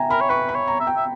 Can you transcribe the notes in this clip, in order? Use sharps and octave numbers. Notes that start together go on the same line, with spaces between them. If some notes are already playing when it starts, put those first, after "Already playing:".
Already playing: E5 G5 G#5 A#5
A#4 B5
C#5
B4 C#6
B5
C#5
A#5
E5
G5
E5